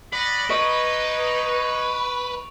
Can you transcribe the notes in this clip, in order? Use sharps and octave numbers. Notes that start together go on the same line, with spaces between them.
D5 D#5 F#5 B5
C#4 D#4 B4 D#5 C#6 D7
F7